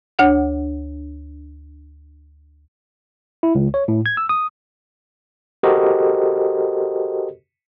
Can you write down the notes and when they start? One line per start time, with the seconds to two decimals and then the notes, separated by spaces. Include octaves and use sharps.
0.19 D2 D4 C#5 F#5
3.43 E4
3.55 C#2
3.74 C#5
3.88 A2
4.06 G#6
4.17 E6
4.29 D#6
5.63 F#4 G4 A4 A#4 C5 D#5